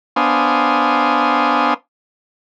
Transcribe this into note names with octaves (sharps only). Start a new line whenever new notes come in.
B3 D4 C5 F5 G#5 D#6